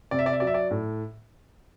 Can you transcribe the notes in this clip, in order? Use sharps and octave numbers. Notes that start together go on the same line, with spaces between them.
C3 D5
E5
D5
E5
F#3 D5
E5
D5
A2